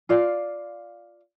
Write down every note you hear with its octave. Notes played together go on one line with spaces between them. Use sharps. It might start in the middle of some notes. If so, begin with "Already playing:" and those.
F4 D5 F5